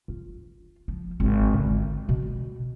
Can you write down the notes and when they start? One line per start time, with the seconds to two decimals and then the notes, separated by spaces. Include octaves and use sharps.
0.08 F4
0.88 F3
1.20 G#1
1.59 D3 F4
2.09 B2